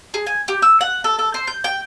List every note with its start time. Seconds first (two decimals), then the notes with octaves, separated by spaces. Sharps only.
0.14 G#4
0.27 G#5
0.48 G4
0.62 E6
0.81 F#5
1.04 A4
1.19 A4
1.34 C5
1.47 G6
1.64 G5